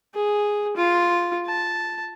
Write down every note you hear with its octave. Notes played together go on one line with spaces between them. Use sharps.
G#4
F4
A5